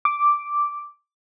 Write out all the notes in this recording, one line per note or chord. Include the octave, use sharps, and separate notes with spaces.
D6